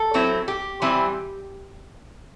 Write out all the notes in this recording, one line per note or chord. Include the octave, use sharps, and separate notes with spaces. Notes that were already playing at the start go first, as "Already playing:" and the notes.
Already playing: A4
F#3 C4 E4
G4
E3 G3 C4 E4